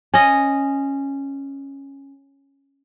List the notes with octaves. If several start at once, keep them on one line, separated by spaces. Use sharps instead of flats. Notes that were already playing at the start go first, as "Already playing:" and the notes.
C#4 D#5